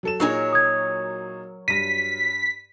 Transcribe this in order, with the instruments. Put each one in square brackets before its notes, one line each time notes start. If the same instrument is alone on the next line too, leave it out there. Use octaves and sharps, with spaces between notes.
[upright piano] F#3 A4 E7
[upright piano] A#2 D#4 G#4 [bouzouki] F#3 A#4 C#5
[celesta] D#6 G#6
[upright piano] G2 A#6 [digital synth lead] B6 [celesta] D#7